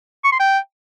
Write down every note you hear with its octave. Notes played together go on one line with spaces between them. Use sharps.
C#6
C6
G5